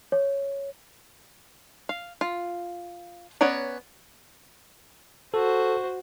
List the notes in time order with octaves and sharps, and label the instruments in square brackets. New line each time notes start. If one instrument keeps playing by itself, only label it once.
[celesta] C#5
[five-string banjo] F5
F4
B3 C#4 C#5 D5 A#5
[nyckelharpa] F#4 C5 [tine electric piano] A4